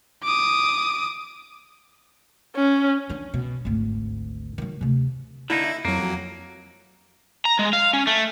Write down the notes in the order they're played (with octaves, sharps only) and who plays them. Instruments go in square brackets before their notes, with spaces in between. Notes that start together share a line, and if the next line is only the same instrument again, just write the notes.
[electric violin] D6 D#6
[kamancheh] C#4
[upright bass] C#4 D4
B2
G#1 D2
D#3 F#3
D2 C3
[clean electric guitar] D3 A#3 D#4 [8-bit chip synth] E4
[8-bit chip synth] F2 F#3 [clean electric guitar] A#3
[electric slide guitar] A#5
G#3
F5
C#4
A3